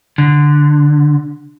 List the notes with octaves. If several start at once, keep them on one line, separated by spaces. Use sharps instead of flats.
D3